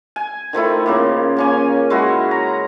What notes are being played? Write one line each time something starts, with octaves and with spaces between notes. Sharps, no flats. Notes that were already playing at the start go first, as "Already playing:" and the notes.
G#5
D#3 F3 A3 E4
C#3 F3 A#3
A#3 C#4 G#5
G#3 E4 F#4
A#5